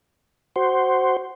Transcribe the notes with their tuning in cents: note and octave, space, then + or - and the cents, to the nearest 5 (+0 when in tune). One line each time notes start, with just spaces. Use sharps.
F#4 +15 C5 +0